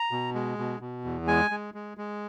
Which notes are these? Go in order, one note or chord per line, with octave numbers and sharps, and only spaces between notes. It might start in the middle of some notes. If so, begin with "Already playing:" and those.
Already playing: A#5
B2
G#3
B2
B2
E2
G#3 G#5
G#3
G#3
G#3